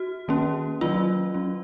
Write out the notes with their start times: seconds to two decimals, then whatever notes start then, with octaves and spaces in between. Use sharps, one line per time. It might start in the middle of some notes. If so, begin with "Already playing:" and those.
Already playing: F#4
0.28 D#3 A#3 C#4
0.81 D#3 F#3 C#4 F4
1.34 F#3 C#4